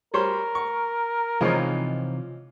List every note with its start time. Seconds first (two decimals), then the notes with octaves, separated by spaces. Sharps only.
0.14 G3 A#4 C5 C#5 C6
0.55 C#6
1.41 C3 E3 F3 G#3 C4 C#4 D#4 F4